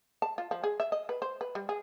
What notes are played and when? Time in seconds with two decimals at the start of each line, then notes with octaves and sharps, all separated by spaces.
0.22 A5
0.38 F4
0.51 F3
0.64 G#4
0.80 E5
0.92 D#5
1.09 B4
1.22 C5
1.41 B4
1.55 G3
1.69 G#4